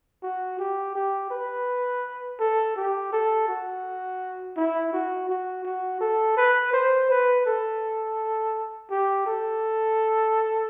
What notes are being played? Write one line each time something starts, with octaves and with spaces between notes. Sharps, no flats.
F#4
G4
G4
B4
A4
G4
A4
F#4
E4
F#4
F#4
F#4
A4
B4
C5
B4
A4
G4
A4